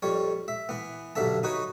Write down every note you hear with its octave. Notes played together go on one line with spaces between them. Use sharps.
F2 G3 C#5
E5
E3 B3
B1 G2 D3 E5 A5
D#4 F#4 B4 C#5